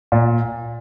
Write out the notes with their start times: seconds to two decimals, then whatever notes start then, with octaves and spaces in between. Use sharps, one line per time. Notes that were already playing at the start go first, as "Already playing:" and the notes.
0.12 A#2